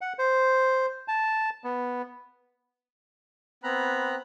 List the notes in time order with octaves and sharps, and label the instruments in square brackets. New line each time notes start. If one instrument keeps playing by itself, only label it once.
[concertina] F#5
C5
A5
B3
[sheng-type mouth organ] B3 C4 A#5 B5 F#6